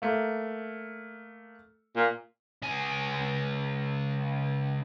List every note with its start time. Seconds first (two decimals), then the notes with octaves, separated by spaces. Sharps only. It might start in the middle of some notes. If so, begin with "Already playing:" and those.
0.02 A3 A#3
1.96 A#2
2.63 C#2 G#5